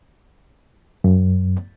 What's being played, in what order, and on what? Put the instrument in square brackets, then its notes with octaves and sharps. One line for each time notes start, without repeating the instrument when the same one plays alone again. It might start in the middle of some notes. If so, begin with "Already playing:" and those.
[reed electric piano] F#2